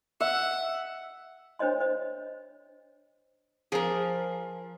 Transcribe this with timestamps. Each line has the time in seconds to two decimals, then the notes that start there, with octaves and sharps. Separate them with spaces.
0.20 E5 F#5
1.59 D4 C5 C#5 D#5 C6
1.80 C5 D#5
3.72 F3 G#4 A#4